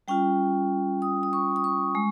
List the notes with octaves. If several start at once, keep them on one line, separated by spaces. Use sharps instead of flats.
G3 C#4 F4 G5
D#6
D#6
C#6
D#6
C#6
G#3